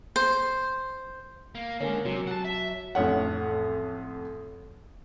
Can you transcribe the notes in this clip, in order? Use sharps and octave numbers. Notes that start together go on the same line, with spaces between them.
C5
A#3
D3 G#3 A#3 C#4
C3 F#3
F#5 A5
E5
A1 F2 C#5 F#5